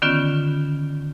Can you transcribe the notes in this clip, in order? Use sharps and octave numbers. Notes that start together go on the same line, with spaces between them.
D3 D#3 B3 C#4 F4